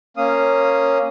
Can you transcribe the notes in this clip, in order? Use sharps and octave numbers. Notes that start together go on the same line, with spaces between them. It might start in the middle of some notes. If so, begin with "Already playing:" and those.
A#3 C#4 F5 D#6